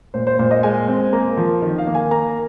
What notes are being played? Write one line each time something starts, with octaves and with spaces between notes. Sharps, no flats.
A#2 C5
C5
A#2 C5
D#5
G#3 G#5
C4
A#3 A#5
F3
D#3
F5
A#3
G#5
A#3 A#5